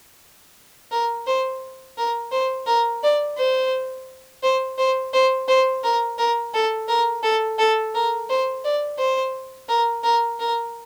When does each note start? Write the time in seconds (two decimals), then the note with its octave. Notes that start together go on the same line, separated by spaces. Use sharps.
0.91 A#4
1.27 C5
1.97 A#4
2.32 C5
2.67 A#4
3.03 D5
3.37 C5
4.43 C5
4.78 C5
5.14 C5
5.48 C5
5.84 A#4
6.18 A#4
6.54 A4
6.88 A#4
7.23 A4
7.59 A4
7.94 A#4
8.29 C5
8.64 D5
8.98 C5
9.69 A#4
10.04 A#4
10.40 A#4